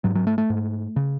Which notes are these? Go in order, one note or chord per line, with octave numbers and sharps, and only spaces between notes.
G#2 F#3
F#3
A3
A3
G#2
C#3